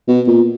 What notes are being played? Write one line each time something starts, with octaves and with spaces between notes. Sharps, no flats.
B2
A#2